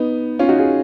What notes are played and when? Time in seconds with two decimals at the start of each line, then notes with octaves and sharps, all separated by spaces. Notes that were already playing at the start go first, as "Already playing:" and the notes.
Already playing: B3 D#4
0.39 C#4 F4
0.49 D#4 F#4
0.58 F4 G#4